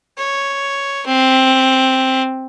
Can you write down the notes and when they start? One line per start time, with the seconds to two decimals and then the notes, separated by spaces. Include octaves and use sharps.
0.18 C#5
1.06 C4